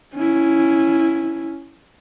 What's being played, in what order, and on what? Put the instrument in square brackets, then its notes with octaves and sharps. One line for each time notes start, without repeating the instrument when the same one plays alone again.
[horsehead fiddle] C#4 E4